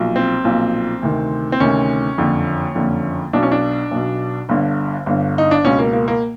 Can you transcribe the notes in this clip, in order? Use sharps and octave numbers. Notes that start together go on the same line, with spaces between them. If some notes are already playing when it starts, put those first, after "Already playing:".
Already playing: B1 A#2 F3
C4
B1 A#2 F3
D2 C3 D#3
C4
D2 C3 D#3 C#4
F#1 F2 D3
F#1 F2 D3
B1 B2 D4
C#4
D4
B1 B2
G1 G2 D3
G1 G2 D3
D#4
D4
C#2 B2 C#4
A#3
A#3
A#3